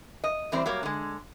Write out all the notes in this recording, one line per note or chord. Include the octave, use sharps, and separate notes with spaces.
D#5
E3 G3 C4 C5 D5
F#3 G3 A#3
D3 G#3